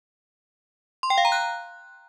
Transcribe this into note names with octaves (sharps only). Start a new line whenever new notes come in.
C6
G5
F5
A#5
F#6